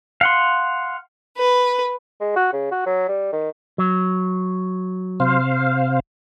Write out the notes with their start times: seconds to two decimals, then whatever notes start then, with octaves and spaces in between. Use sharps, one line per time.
0.21 F5 F#5 C6
1.37 B4
2.20 G#3
2.36 F#4
2.53 C#3
2.71 F#4
2.86 F#3
3.08 G3
3.32 D#3
3.78 F#3
5.20 C3 C5 F5